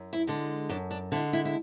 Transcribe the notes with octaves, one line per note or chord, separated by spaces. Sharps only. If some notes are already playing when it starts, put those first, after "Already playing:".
Already playing: F#2
E4
D3 G#3
F#2 D4
D4
D3 G#3 E4
E4
E4